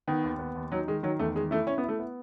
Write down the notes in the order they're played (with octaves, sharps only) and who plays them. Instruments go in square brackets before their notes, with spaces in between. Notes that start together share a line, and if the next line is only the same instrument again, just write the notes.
[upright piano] D#3 [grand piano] B3
[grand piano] D#2
B3
D#2
[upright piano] F#3 [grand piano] D#4
[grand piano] D#3 [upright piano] G#3
[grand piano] D#3 [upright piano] F#3
[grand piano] E2 [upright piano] A3
[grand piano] D#3 [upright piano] G#3
[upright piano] A3 [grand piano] E4
[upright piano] C#4 [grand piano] E4
[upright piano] B3
[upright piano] A3 [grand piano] E4
[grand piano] B3